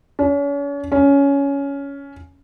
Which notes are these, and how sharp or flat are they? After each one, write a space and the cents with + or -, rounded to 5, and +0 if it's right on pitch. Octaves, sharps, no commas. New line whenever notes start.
C#4 +40
C#4 +15